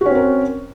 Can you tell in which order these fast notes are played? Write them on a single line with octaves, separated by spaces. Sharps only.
F#4 C#4 C4 A#4